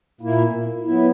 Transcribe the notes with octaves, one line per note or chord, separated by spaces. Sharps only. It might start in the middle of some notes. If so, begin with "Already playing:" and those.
A#2 A#3 E4
F#3 B3 E4